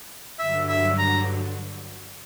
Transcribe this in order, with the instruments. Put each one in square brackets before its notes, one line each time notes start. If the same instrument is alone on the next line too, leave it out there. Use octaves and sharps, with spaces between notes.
[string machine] G2 D3 F#3 [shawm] E5
[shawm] E5
A#5